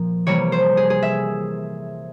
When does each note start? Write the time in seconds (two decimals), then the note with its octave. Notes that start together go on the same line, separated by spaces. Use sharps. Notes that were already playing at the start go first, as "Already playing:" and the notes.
Already playing: A#2 F3 A#3
0.26 C3 E3 G3 A#3 C#5
0.52 C5
0.77 G#4
0.90 G#4
1.02 E5